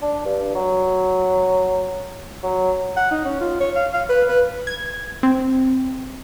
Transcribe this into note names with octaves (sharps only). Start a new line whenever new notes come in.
D4
G2
F#3
F#3
F#5
D#4
C#4
F4
C#5
F5
F5
B4
B4
G#6
C4